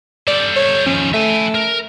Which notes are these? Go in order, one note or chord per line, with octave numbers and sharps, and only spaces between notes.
G3 A4 D5
C#5
D#2 F3 C#4
A3 E5 G#5
A#4